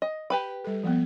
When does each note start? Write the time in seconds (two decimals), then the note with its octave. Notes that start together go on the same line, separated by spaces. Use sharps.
0.02 D#5
0.30 G4 B4 G5 B5
0.64 G3 A4
0.83 F3 A#3 B3